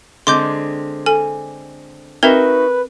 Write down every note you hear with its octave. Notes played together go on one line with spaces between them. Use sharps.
D3 G#3 C4 C6 D6 G6
A4 G#5
C4 D#4 F#4 A#4 B4 E5